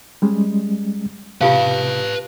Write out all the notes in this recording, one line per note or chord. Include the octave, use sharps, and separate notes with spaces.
G3 G#3 C#4
C3 F4 G4 B4 F5 A5